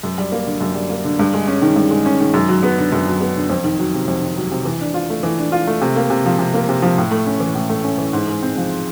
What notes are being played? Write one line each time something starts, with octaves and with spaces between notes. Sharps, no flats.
F#2
G3
A#3
D3
F#2
G3
A#3
D3
G2
G#3
C#4
D#3
G2
G#3
C#4
D#3
F#2
F#3
B3
D3
F#2
F#3
B3
D3
F2
D#3
F#3
C3
F2
D#3
F#3
C3
E3
D4
F4
A3
E3
D4
F4
A3
C3
A#3
C3
F3
C3
A#3
C3
F3
A2
A3
C#4
E3
A2
A3
C#4
E3
G#2
G#3
C4
F3